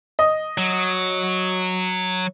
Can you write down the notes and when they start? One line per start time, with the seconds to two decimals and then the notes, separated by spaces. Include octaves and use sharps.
0.19 D#5
0.58 F#3